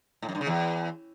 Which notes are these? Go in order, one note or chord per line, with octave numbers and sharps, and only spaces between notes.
A2
F#2
G2
C#3
E2